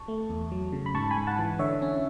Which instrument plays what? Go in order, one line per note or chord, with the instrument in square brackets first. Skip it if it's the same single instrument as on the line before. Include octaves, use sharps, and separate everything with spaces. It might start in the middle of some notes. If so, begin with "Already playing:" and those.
Already playing: [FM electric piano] A5 C#6
A3
E2
F#3
C#3
B5
G#2 A5 C#6
G#5 B5
G#2
F#5 A5
E3
D3 C#5 E5
C#4